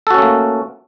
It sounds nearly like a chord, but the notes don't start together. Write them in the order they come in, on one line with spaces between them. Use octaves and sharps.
A4 F#4 C#4 A3 A#3